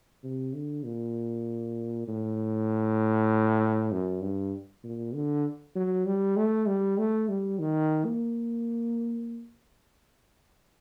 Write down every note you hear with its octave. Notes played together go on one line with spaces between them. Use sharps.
C3
D3
A#2
A2
F#2
G2
A#2
D3
F#3
G3
A3
G3
A3
G3
D#3
A#3